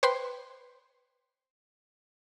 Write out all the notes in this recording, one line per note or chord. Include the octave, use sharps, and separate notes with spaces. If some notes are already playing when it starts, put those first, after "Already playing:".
B4 C5 G5 B5 C6